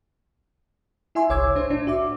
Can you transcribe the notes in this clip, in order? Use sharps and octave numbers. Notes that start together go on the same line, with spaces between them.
E4 E5 G#5 C6
G1 C2 C#5 D6 E6 G#6
D4 C5
A2 D4
F#4 E5 D6